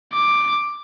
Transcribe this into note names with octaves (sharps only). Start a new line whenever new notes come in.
D6